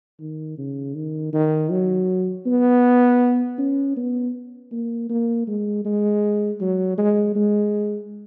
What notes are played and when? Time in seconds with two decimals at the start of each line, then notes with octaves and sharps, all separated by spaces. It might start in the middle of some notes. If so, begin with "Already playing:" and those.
0.20 D#3
0.58 C#3
0.94 D#3
1.33 D#3
1.70 F#3
2.46 B3
3.58 C#4
3.97 B3
4.72 A#3
5.09 A#3
5.48 G#3
5.85 G#3
6.61 F#3
6.98 G#3
7.35 G#3